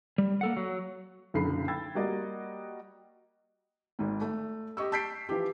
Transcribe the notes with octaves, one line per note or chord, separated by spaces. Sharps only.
G3
A#3 A4 F#5
F#3
F#1 B1 F#2 D3 B5 C7
G5 B5 E6 G#6 A6
G3 A#3 F#4 D5 D#5
G#1 G#2
A3
G4 D#5 C#6 E6
A5 E6 G6 B6 C7 D7
E3 F3 G4